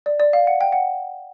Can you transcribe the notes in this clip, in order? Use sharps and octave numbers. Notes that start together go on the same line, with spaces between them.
D5
D5
F5
F#5
G5
F#5